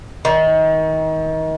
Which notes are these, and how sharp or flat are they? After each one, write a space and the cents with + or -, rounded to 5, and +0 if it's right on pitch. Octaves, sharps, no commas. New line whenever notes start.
D#3 +30